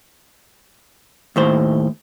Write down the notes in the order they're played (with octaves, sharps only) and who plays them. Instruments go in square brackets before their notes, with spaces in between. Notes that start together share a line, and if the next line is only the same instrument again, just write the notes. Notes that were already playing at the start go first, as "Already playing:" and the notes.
[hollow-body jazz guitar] D#2 A2 C5